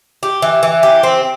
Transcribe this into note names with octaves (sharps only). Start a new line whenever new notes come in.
G4
E3
E3
G4
C4